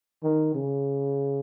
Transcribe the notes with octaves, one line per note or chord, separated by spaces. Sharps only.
D#3
C#3